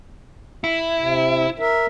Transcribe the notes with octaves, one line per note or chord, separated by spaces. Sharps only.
E4
C3
A#4 E5